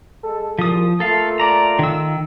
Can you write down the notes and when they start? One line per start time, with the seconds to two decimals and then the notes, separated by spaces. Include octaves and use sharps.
0.23 G#3 A4
0.59 C2 A#2 C#3 F3 D#6
1.00 A3 A#3 F4 A4 F5
1.40 D5 A#5
1.79 D#3 E6